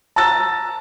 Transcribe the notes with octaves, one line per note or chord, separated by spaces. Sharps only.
A5 A#5 E6 A6